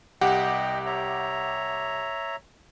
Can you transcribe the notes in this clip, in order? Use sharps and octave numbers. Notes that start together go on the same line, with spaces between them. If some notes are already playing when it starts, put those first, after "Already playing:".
C2 G4 D#5 F#5 G5
C#5 E5 A#5